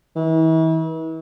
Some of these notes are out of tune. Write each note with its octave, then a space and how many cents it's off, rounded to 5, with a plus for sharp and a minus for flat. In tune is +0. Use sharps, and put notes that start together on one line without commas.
E3 -40